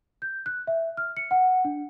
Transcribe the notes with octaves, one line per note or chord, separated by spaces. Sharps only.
G6
F#6
E5
F6
C#7
F#5
D4